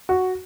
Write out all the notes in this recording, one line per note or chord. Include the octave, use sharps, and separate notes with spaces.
F#4